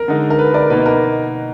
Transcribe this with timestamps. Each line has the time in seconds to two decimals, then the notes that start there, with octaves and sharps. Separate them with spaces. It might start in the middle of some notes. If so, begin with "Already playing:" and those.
Already playing: A#4
0.08 D3 G#3 D#4
0.30 A#4
0.39 B4
0.54 A#4 D5
0.70 B2 A#3 D#4 B4
0.86 A#4